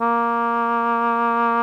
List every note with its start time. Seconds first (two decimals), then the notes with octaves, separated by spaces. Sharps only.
0.01 A#3